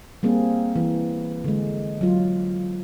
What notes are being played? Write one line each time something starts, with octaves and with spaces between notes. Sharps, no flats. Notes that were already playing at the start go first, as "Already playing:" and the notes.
G3 A#3 C4 G#4
E3
D3 G#3
F#3 F4